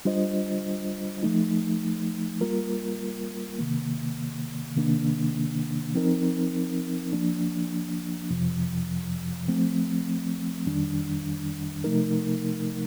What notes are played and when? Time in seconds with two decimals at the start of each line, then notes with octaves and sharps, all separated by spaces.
0.05 G3 D4 F4 C5 D#5
1.23 F3 A3 D#4
2.41 G3 A#3 F4 A#4
3.59 C3 D#3 A#3
4.76 C3 D#3 A#3 D4
5.94 F3 C4 D#4 A#4
7.13 F3 A#3 D4
8.30 F2 C3 F3
9.48 F3 A3 C4
10.66 F2 D#3 G3 D4
11.84 C3 F3 A3 D#4 A#4